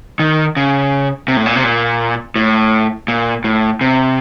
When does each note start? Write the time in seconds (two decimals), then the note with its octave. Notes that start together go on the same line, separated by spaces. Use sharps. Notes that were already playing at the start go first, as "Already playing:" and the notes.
0.19 D#3
0.56 C#3
1.28 C3
1.37 A2
1.46 A#2
1.56 C3
1.63 A#2
2.36 A2
3.08 A#2
3.44 A2
3.81 C3